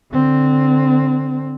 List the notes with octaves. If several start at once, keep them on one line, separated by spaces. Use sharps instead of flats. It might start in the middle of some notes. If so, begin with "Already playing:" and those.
D3 C4